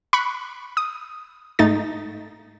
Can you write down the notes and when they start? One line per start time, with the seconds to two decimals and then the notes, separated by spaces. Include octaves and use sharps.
0.13 B5 C#6 F#6
0.77 D#6
1.59 G#2 A3 D#4 A6